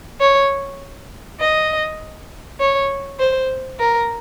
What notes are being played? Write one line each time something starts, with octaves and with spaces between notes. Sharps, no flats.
C#5
D#5
C#5
C5
A#4